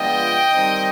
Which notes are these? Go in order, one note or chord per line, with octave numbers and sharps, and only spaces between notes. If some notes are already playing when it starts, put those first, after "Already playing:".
Already playing: F3 G#3 B3 D4 F4 D#5 G5
D#3 G3 C4 D#4